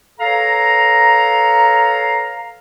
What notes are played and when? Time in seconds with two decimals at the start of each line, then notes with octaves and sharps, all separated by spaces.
0.20 A4 B4 C#5 F5 A#5